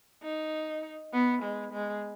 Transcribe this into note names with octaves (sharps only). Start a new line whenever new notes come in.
D#4
B3
G#3
G#3